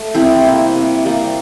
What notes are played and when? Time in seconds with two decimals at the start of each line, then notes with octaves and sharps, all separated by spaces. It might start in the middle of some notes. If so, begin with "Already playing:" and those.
Already playing: A3
0.14 C3 C4 E4
0.44 G3 A#3
0.75 C3
1.05 G3 A#3